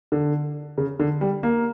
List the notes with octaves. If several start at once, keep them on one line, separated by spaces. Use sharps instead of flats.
D3
C#3
D3
G3
A#3